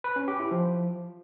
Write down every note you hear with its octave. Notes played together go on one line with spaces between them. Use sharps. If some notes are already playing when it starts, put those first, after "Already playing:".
B4
C#4
G4
E4
F3